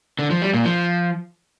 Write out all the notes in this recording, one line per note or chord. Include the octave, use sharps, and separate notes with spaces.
D3
F3
G3
A#2
F3